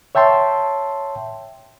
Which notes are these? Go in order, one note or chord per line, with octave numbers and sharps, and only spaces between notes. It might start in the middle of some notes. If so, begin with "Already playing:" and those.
C#5 E5 G5 A5 C6